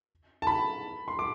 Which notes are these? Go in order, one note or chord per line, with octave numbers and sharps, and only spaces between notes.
A5
B5
C6
D6